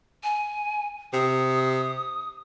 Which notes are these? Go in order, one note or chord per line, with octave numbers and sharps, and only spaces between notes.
G#5
C3 D#6